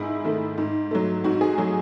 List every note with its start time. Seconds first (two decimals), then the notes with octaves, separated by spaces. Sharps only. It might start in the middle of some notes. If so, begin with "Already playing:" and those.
Already playing: G#2 D#3 E4 G#4
0.25 D#3 A3
0.58 G#2
0.91 F#3 A3
1.24 G#2 F#4
1.41 G#4
1.58 F#3 A3